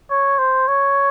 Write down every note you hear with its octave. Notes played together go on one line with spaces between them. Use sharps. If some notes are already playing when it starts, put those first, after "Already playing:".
C#5
C5
C#5